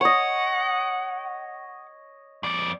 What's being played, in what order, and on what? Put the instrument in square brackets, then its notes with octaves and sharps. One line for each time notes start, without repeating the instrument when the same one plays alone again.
[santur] C#5 D#5 [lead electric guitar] F#5
[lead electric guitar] F2 D5